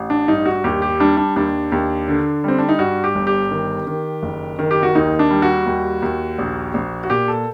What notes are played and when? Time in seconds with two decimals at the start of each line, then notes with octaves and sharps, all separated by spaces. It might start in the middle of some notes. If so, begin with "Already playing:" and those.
Already playing: A1
0.10 D4
0.28 G2 D#4
0.46 F#4
0.64 D#2 G4
0.82 G4
1.00 G3 D4
1.17 D4
1.36 D#2 D4
1.72 D#2
2.08 D3
2.44 G3 C4
2.58 D4
2.69 D#4
2.79 G2 F#4
3.04 G4
3.15 G1
3.27 G4
3.51 D#3
3.87 D#3
4.23 F#1
4.59 D#3
4.71 G4
4.83 F#4
4.95 D#2 D#4
5.19 D4
5.31 G3
5.42 F#4
5.66 D#2
6.02 D#2
6.39 A#1
6.74 A#1
7.04 F#4
7.10 A#2 G4
7.28 A4